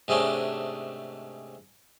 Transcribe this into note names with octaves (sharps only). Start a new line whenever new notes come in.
G#2 C3 G#3 A3 C#4 D4